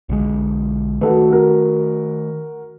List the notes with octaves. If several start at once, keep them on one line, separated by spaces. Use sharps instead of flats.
B1 D3 G#3
D#3 A3 F#4 A4 B4
F#4 A#4